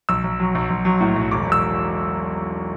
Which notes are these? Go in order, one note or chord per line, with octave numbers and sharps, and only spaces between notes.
B1 E6
B1
F#3
B1
B1
F#3
A2
B1
E1 D6
E1
E6